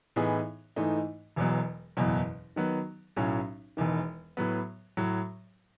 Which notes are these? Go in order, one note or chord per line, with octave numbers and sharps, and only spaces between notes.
A2 E3 B3 D#4 G#4
G#2 E3 A3 D#4
E1 E2 B2 F#3
F#1 E2 B2 F#3
D#3 F#3 B3
B1 A2 F#3 C#4
E1 E2 D#3
A2 F#3 B3
A2 F#3